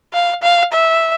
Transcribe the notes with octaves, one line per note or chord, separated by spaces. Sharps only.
F5
F5
E5